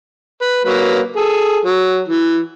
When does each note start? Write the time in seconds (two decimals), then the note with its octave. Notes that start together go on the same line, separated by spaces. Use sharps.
0.42 B4
0.65 F#3 A#3 B4
1.16 G#4 A4
1.65 F#3
2.08 E3